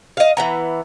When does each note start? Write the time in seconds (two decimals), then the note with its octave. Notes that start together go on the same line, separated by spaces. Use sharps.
0.17 D#5 F5
0.37 E3 B3 A#5